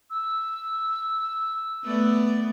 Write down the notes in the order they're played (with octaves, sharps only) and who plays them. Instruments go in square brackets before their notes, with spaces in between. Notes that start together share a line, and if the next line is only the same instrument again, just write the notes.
[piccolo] E6
[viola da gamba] A3 B3 D5